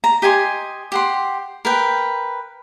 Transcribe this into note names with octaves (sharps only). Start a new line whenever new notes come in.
A#5
G4 D#5 G#5 C6
G4 F#5 C6
A#4 B4 G5